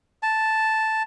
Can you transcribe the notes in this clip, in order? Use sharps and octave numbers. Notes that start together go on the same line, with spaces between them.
A5